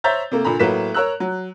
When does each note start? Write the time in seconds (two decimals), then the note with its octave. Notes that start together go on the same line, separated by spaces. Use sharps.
0.04 C5 C#5 E5 A#5 G6 A6
0.31 C3 A3 A#3
0.44 A#2 D3 A#5 B5
0.59 A2 F#3 A#3 B4 B6 E7
0.94 A#4 C#5 A#5 E6 F#6
1.20 F#3